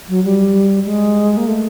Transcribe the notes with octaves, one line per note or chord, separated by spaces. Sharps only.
F#3
G3
G#3
A#3
A3